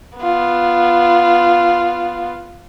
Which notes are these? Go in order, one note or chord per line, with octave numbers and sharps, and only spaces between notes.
B3 F4